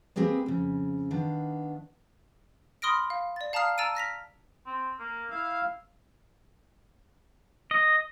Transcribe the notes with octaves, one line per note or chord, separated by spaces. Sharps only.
A#3 C4 G4 G#4 B4
F2 C#3
D#3 B3 D4 F5
B5 C6 D#6 F6 A#6 D7
F5
D5 A6
F5 A5 A#5 D#6 F6 C7
A5 A#5 E6 A6 D7 D#7
F6 A#6 B6 F7
C4
A#3
E4 F5
D#5